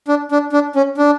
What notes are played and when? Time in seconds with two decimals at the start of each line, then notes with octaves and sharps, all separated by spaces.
0.08 D4
0.32 D4
0.53 D4
0.76 C#4
0.98 D4